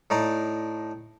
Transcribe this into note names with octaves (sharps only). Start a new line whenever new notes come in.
A2 D#4 D5 A#5